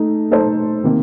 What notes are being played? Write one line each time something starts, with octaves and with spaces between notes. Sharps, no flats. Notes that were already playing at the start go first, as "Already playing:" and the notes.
Already playing: A3 D#4
A3 D#4 A4 C5
C3 D#3 A#3